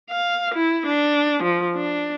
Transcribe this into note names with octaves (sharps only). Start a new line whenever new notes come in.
F5
E4
D4
F3
D4